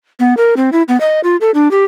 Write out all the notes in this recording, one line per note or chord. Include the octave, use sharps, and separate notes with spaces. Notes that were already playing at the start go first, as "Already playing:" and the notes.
B3
A#4
C4
E4
B3
D#5
F4
A4
D4
G4